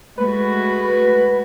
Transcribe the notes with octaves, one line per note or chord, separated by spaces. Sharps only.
G#3 A3 F#4 B4